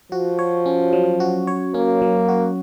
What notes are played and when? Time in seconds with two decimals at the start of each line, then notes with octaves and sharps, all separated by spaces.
0.12 F3 F#4
0.39 C#5
0.66 C#4
0.93 F#3
1.20 F#4
1.47 C#5
1.74 A#3 C#4
2.02 F#3
2.28 F#4